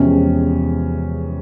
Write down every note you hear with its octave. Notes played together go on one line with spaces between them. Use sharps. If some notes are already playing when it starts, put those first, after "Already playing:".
Already playing: E2 C3 F3 G#3 C#4